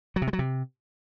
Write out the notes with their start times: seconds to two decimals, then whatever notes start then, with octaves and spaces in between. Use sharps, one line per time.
0.16 F#3
0.22 C3
0.27 G#3
0.33 F#3
0.39 C3